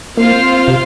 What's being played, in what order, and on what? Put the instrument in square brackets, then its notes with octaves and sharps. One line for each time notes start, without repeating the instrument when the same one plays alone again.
[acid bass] A#3 [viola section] C4 F4 C5 F5
[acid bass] C3